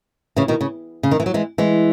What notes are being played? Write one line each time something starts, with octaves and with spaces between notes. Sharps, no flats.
C#3 E3
B2 D#3
C#3
C#3
D#3
E3
F#3
E3 G#3
E3 G#3